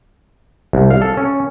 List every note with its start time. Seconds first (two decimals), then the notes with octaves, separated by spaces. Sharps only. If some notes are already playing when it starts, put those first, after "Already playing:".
0.73 C2
0.91 F5
1.02 A4
1.17 C#4